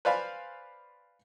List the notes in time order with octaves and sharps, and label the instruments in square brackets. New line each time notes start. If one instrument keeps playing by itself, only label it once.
[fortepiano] B4 C5 D5 F5 G#5 B5